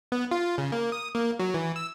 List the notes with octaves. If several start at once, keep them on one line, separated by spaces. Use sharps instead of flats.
B3
F4
C#3
A#3
D#6
A#3
F#3
E3
E6